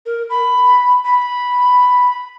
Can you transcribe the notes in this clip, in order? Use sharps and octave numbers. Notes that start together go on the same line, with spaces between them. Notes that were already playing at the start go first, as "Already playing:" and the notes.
A#4
B5
B5